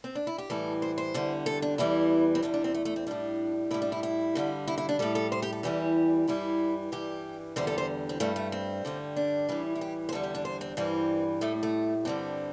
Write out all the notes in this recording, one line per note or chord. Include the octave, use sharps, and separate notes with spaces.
C4
D4
E4
G4
A2 E3 G3 A4
C5
C5
E2 D3 G3
A4
D4
E2 E3 G3 E4
C4
E2 D3 G3 D4
D4
C4
A3
A3
C4
A2 G3 D4
A2 G3 E4
D4
E4
E4
G2 D3 G3
E4
E4
D4
A2 G3 A4
A4
C5
G4
A4
E2 E3 G3 G4
G2 E3 G3 E4
G2 E3 G3 G4
E2 D3 G3 C5
A4
C5
C4
G2 G3 A3
A3
C4
G2 D3 G3
D4
A2 E3 G3
E4
G4
C5
E2 D3 G3 A4
G4
D4
C5
C4
G2 E3 G3 C4
A2 G3 A3
A3
G2 D3 G3 C4